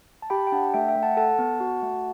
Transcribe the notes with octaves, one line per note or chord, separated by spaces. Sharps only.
A5
G4 G5 B5
G5
D4 F#5 A5
A3 E5 G5
E5 G5
A3
F#5 A5
A4 F#5 A5
B3
F#4
A3